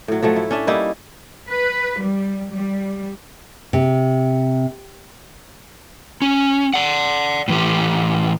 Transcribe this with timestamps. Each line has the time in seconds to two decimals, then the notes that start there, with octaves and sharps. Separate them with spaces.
0.08 A2 F#3
0.22 F3 F#3 A3
0.36 E4
0.51 C#4 D4 E5
0.67 G3 A#3 D#4 E4
1.49 B4
2.01 G3
2.52 G3
3.73 C3
6.22 C#4
6.74 D5 F#5
7.48 A2 E3 G4